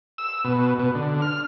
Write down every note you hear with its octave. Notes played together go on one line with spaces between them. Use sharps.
E6
B2
B2
D3
F6